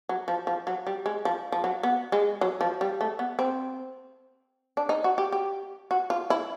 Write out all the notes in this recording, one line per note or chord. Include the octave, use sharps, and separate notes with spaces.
F#3
F3
F3
F#3
G3
G#3
F3
F3
F#3
B3
G#3
F#3
F3
G3
A3
B3
C4
D4
D#4
F#4
G4
G4
F#4
F4
E4